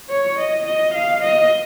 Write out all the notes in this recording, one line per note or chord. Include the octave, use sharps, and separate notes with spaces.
C#5
D#5
D#5
F5
D#5